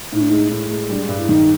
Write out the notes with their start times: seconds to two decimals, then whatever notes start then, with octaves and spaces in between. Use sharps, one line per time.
0.12 A2 D#4
0.21 D4
0.30 G#3 D#4
0.51 A2
0.71 G#3
0.89 G3 D4
1.09 G2
1.18 E4
1.29 D#3 D#4